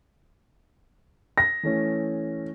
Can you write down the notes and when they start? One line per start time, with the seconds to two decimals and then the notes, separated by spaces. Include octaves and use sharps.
1.38 A#6
1.63 E3 A3 C#4